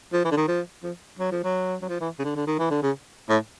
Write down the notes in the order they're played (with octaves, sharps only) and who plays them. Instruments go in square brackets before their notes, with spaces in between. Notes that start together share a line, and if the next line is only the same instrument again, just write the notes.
[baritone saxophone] F3
E3
D3
D#3
F3
F3
F#3
F3
F#3
F#3
F3
E3
C#3
D3
D3
D#3
E3
D3
C#3
A2